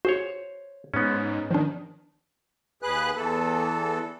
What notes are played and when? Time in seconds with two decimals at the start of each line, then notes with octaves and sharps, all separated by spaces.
0.05 F#4 G#4 C5 C#5
0.94 G#2 B3 C#4
1.51 D#3 F3 D4
2.82 D#2 G#4 B4 F#6
3.16 E2 E3 A4